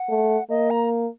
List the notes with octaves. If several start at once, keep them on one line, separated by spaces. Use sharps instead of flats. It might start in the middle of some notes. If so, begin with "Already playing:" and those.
Already playing: F#5
A3
A#3 D#5
A#5